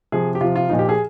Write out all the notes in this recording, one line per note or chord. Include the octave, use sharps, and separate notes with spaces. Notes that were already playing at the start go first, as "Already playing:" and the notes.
C3 F3 G#4
G4
C3 F3 F4
F4
A#2 F3 D#4
G4
G#4